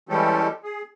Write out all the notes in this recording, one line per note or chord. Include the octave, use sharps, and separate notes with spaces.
E3 G3 G#3 C#4 G4 A4
G#4